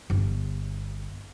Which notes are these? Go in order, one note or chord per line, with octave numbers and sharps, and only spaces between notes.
G1